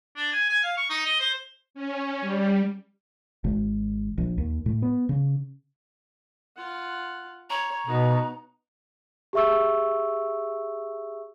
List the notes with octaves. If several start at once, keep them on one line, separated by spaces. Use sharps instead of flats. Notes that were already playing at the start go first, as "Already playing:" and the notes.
D4
G#5
G#5
F5
C#6
D#4
D#5
C5
C#4
G3
G#1
A#1
D#2
A2
B3
C#3
F4 F#5
C#5 A#5
B2 B3 D#4
G4 G#4 E5 C#6 E6